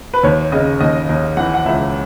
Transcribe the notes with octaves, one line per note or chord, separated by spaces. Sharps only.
B4
D#2 C#5
C#3 D#5
D#2 D#5
D#2
E3 F#5
F#5
C#2 E5